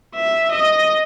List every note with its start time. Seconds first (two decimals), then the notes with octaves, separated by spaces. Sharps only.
0.15 E5
0.52 D#5